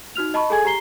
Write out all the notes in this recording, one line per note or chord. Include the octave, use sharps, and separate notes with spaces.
D#4 F#4 F6 F7
D#5 A5 B5 C#6
G#4 A4 G#5 G#6
G4 A#5 C7 G7